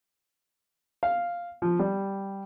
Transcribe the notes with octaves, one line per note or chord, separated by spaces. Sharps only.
F5
F3
G3